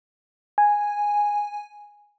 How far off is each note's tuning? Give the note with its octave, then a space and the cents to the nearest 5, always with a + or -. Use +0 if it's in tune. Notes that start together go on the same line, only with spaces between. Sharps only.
G#5 -5